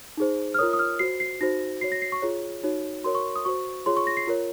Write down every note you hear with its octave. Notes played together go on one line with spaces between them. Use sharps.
D#4 G#4 C5
F6
F4 A#4 C#5 D#6
D#6
F6
F#4 C5 C7
C7
D#4 F#4 C5 A#6
F#4 C#5 C7
A#6
C7
C#6
F4 G#4 C#5
D#4 F#4 C#5
F#4 A#4 C#5 C6
C#6
D#6
F#4 C5 C#6
F4 G#4 C#5 C6
C#6
A#6
C7
F4 A#4 C#5